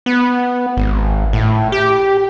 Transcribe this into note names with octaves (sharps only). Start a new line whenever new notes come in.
B3
G#1
A2
G4